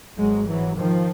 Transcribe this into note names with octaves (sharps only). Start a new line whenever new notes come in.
G#1 G#2 F#3 G#3
E3 F#3
D#3 F3